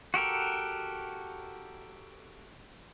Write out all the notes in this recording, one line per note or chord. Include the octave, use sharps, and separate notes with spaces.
F#4 G4 A4 A#4